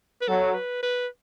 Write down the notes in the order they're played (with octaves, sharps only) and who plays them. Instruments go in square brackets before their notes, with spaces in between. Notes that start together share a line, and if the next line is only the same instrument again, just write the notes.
[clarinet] B4
[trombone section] F#3 [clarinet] A4
[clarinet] B4
B4